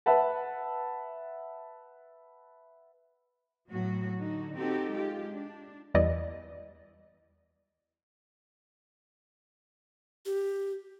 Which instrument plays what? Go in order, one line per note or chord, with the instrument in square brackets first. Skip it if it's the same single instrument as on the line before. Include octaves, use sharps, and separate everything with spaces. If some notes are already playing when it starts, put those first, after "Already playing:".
[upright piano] B4 E5 F#5 A5
[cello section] A2 F#3 B3 F#4
D3 D#4 F#4
C4 D#4 F#4 G4 A4
G#3 F4 G4
D4
[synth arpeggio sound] E2 E3 G3 E4 D5 D#5
[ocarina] G4